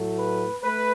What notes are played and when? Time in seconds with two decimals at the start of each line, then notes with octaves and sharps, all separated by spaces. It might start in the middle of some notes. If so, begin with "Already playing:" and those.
Already playing: A2 F#3 A3
0.19 B4
0.63 A3 B4